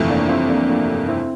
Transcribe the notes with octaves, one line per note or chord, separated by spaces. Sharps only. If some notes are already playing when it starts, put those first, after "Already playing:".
Already playing: G1 F2 C3 E3 A3
A#3 D4
C4 E4
A#3 D4
A#3 D4
C4 E4